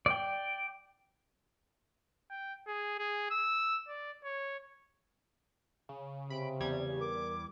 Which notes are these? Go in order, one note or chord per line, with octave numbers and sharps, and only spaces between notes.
D5 G5
G5
G#4
G#4
E6
D5
C#5
C#3
C3 B5 D7
E2 G3 G#6
A#4 D6